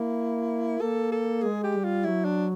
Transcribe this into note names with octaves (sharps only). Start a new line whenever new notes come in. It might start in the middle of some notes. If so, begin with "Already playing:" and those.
Already playing: A#3 E4
A#3 A4
A4
G#3 G#4
G4
G3
F4
F#3 E4
D4